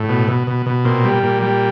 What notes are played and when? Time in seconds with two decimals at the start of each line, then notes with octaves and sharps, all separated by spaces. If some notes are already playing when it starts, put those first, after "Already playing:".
Already playing: A2
0.09 B2
0.28 B2
0.47 B2
0.66 B2
0.85 A#2 C4
1.04 G3
1.23 A#2
1.42 G3